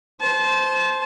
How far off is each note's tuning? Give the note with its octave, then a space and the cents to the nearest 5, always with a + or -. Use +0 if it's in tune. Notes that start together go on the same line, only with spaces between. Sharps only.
C5 +0 A5 -30